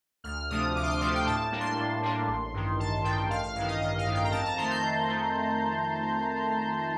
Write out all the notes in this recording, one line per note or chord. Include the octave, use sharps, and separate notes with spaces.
D2 F6
C3 F3 A3 D4 D#6
D2 D6
C6
D6
C3 F3 A3 D4 C6
G5
A2 A5
G3 A#3 D4
C6
A2
G3 A#3 D4
A1
G2 D#3
A1 A5
G2 D#3 G5
A1 F5
F5
G2 D#3 F5
D#5
A1 D#5
F5
G2 D#3
G5
A#5
F2 A5
A#5
D#3 A3 C6
G6
F2
D#3 A3